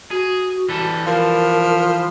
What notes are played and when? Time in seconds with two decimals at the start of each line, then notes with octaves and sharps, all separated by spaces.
0.11 F#4 G#4
0.69 E3 G3 A4
1.06 F3 A#4